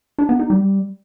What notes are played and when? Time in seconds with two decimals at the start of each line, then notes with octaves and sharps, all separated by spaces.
0.19 D4
0.29 B3
0.39 D#4
0.50 G3